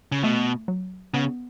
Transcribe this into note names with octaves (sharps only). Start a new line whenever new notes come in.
C#3
B2 A3
F#3
C#3 B3